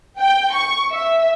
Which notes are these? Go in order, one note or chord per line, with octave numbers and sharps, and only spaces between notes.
G5
C#6
E5